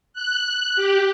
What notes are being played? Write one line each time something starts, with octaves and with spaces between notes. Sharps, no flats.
F#6
G4